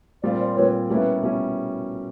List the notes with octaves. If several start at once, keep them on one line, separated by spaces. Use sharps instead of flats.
A#2 G3 C4 F4 C5 D5
C5 D5
A#2 G3 C4 F4 B4 C#5
B2 G3 A#3 C#4 E4 B4
B2 G3 A#3 C#4 E4